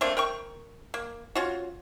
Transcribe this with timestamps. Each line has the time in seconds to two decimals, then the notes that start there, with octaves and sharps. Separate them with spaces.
0.01 A3 A#3 C4 D4
0.17 A#4 G5 C#6
0.94 A#3
1.35 C#4 F4 F#4